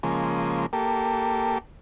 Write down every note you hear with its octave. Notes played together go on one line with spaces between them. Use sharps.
C#3 F3 G#3 A#3
A#3 G4 A4